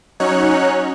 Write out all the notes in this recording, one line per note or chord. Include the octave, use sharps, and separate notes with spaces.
F#3 C#4 D#4 C#5 F#6